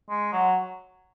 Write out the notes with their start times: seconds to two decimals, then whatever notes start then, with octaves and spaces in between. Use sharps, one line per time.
0.09 G#3
0.32 F#3